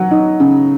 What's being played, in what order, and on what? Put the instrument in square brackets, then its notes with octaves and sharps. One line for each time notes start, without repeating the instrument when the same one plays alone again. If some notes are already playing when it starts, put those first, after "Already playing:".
Already playing: [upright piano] F#3 F#5
D#4
C#3